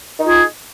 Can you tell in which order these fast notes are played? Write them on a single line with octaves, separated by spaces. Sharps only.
D#4 F4 G#4